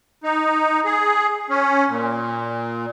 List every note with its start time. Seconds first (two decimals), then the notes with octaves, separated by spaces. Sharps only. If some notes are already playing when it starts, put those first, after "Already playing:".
0.24 D#4
0.85 G#4
1.50 C#4
1.89 A#2